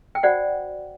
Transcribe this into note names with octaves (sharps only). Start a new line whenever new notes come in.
G5
F#4 C5 D5 F#5